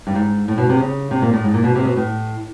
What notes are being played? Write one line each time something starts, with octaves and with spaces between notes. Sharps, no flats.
G2
G#2
A2
B2
C3
C#3
C3
A#2
A2
G#2
A#2
B2
C3
B2
A2